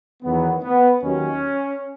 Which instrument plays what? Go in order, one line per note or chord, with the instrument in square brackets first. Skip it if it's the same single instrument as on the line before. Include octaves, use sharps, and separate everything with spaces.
[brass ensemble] E2 D#3 F#3 B3
B3
D#2 D#3 F#3 C#4